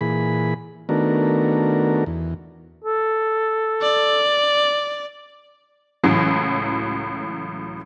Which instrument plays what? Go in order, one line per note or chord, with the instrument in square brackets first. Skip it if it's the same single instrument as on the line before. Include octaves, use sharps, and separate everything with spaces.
[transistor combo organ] A#2 E3 G#4 B5
D#3 A3 B3 D4 F#4 A#4
E2
[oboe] A4
[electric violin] D5
[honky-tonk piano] C#2 A2 E3 F#3